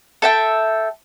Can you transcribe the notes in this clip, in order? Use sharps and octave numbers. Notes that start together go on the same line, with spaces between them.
A4 E5 G5